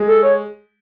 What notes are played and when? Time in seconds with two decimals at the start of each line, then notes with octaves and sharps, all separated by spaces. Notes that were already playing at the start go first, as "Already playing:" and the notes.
Already playing: G#3
0.08 A4
0.23 C#5